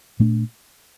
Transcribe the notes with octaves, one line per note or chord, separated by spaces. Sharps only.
A#2 A3 D4